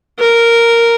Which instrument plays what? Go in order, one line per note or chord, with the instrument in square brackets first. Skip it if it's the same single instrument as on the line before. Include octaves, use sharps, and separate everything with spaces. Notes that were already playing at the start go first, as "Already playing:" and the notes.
[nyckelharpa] A#4